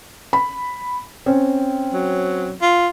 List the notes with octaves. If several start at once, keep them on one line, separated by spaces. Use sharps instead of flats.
B5
C4 C#4
F#3
F4